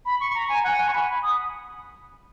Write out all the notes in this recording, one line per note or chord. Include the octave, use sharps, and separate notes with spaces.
B5
C#6
A#5
G#5
F#5
G#5
C#6
B5
B5
D#6